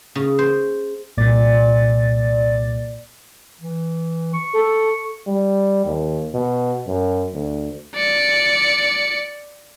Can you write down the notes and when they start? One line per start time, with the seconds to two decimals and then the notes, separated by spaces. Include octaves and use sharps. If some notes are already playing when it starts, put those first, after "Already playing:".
0.15 C#3
0.39 C5
1.17 C2 A#2 D5 A6
3.61 E3
4.34 C#6
4.53 A4
5.27 G3
5.85 D#2
6.34 B2
6.87 F#2
7.33 D2
7.95 D5 C#7